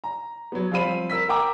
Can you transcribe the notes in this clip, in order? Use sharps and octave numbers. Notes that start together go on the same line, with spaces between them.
A#5
F#3 B3
F3 G3 C4 F5 B5 D#7
A#4 E6 B6
A#4 F#5 G5 A#5 D6 E6